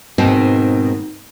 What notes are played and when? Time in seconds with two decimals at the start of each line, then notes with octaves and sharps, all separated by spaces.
0.18 G#2 B2 D#3 C4 D#4